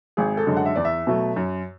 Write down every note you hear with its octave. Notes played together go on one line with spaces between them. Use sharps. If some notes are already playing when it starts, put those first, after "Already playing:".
G#1 G#4
A4
F#2 D3 G#3
F#5
E5
E2 D5
E5
B2 F#3 A3
F#2